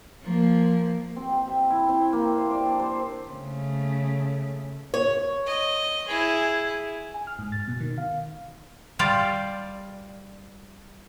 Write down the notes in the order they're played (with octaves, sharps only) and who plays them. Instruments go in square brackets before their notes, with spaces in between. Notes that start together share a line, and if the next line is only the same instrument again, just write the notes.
[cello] F3 A#3
[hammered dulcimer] C4
G5
E5
E4
C4
A#3
C5
D5
D4
C5
[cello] C#3 A3
[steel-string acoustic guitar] C#5
[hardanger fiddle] D#5
E4 G#4
[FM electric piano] G#5
F6
G#2
A6
B2
D#3
F5
[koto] G3 F4 D5